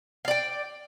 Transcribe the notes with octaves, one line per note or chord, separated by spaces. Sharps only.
D5 F5 G5